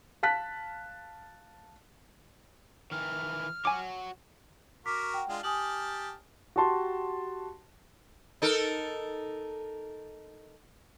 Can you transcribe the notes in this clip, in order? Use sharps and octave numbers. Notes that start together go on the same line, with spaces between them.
F5 A5 F#6 B6
D#3 E3 F6
F#4 C#5 G#5 D6
F#4 A#4 D6 F6 B6
F#5 G5
G#3 D4 F4
G4 G#5 A5 D#6 F6 F#7
F#4 G4 A5 C6
D#4 A4 A#4